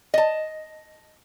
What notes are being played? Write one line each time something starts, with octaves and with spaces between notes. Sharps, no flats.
D#5 A5